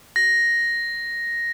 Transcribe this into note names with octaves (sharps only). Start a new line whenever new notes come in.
A#6